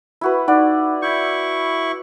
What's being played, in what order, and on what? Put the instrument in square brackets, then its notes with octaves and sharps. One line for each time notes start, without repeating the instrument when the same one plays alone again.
[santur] E4 F#4 B4
[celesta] D#4 F#5 F#6 [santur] D5
[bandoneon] E4 C#6 [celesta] G6 G#6